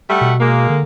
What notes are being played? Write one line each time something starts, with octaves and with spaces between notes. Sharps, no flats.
G3 A3 F#5
B2
G#3 A#3
D3